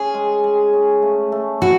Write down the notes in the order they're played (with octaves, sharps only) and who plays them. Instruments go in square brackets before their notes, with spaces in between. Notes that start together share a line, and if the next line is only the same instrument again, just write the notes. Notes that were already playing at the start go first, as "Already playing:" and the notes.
Already playing: [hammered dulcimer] C#4 [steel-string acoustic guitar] G#4
[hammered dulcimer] G#3
G#3
C#4
A3
A3
[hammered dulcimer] E4 [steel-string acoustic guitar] F#4